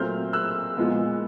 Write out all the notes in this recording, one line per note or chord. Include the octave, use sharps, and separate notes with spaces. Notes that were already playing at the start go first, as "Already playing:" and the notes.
Already playing: A#2 F#3 A3 C4 F6 G6
E6 F#6
A#2 F3 G#3 B3